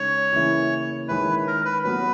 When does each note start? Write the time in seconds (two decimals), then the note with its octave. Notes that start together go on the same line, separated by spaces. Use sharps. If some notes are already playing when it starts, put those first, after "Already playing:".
Already playing: C#3 G#3 D#4 C#5
0.32 C#3 E3 A#3 E4
1.08 D#3 G#3 C#4 E4 B4
1.47 A#4
1.65 B4
1.84 F#3 B3 F#4 B4